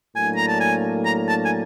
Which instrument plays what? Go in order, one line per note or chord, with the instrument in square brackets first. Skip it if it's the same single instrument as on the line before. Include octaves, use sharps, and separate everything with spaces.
[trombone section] A2 F#3 A#3 D4 [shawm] G#5
[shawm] A#5
A5
G#5
A#5
A5
G#5